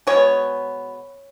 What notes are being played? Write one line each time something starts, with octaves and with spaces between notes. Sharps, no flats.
B2 G#3 B3 G#4 C#5